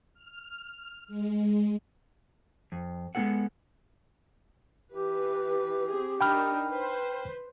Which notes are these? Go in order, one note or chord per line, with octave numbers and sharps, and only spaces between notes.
F6
G#3
F2
G#3 B3 C#4 G#4 A4 F#5
E3 G4 B4
C4 G#4
D4 D#4 A#4 G5 B5 F6
B4 C5